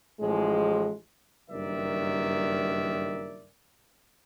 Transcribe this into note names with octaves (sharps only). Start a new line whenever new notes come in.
A1 A2 F3 G#3
F#1 G2 D#3 A#4 D5 E5